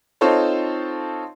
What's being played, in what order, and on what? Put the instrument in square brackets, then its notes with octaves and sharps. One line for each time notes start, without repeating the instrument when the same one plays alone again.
[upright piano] C4 D#4 F4 A4 C5 C#5